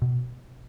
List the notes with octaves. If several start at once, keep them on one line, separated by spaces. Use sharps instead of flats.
B2